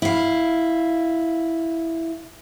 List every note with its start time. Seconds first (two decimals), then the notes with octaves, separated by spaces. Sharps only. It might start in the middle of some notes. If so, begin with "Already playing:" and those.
0.02 E4 F5